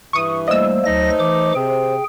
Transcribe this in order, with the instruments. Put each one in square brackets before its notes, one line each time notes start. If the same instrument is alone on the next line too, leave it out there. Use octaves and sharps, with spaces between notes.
[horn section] G2 E3 [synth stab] C#6 D#6
[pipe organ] G3 A3 A#3 [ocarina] C5 [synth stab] D#5 E6
[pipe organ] D2 F#3 A#6 [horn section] A3 D#4
[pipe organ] E3 D6
[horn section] C3 [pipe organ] G#4 G5